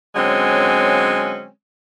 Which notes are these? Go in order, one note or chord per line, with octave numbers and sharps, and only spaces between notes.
D3 F#3 G#3 C4 C#4